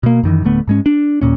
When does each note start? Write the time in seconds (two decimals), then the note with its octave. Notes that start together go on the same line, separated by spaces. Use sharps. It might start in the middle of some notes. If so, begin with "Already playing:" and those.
0.03 B2 A#3
0.23 F#2 D#3 E3
0.44 D1 D3 A3 B3
0.68 G#2 G#3 C#4
0.86 D4
1.21 D#2 A#2 C#4